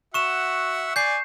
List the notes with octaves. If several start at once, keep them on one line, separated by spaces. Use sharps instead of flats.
F#4 E5 F#5 C#6 E7
D5 G#5 G6 C7